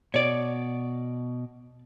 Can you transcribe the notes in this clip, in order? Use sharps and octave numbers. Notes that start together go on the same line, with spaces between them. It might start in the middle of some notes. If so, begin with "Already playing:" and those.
B2 C#5 D5